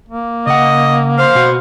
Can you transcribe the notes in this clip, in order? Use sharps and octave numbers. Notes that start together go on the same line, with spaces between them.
A#3
C#3 D#5 F#5
C5 F5
B2 F#4